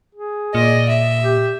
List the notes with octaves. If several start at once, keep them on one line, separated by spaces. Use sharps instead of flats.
G#4
A#2 D5 D#5
E5
G4